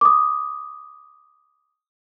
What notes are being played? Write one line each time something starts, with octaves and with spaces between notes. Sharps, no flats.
D6 D#6